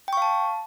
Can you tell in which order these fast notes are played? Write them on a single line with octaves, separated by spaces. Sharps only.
G5 C#6 F5 A5